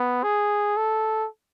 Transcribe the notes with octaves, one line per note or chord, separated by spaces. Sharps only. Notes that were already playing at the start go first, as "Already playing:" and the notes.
Already playing: B3
G#4
A4